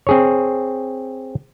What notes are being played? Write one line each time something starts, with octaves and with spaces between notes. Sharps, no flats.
C4 G#4 C#5